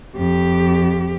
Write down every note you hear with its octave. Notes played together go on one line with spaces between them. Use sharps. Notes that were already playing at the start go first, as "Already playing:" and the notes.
F2 G4